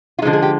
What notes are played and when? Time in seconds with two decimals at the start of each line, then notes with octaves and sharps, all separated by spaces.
0.19 F4
0.22 D3 F3 G#3 D#4
0.33 G#4
0.42 G4